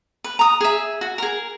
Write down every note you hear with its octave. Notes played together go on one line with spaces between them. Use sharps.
B4
A#5 D#6
G#4 E5
F#4
G#4 A#4